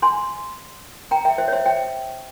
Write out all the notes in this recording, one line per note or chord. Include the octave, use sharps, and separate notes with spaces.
G#5 C6
G5 A#5
E5 G5
C5 E5
C#5
C5 E5
E5 G5